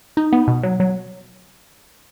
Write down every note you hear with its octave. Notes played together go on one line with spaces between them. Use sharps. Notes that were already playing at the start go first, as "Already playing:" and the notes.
D#4
B3
B2
F#3
F#3